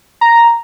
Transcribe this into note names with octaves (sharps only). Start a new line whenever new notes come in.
A#5